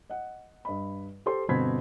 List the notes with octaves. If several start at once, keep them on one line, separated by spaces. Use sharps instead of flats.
D#5 F#5
G2 D#5 B5
G4 A4 C5 C6
G1 B2 C4 B5 G#6 B6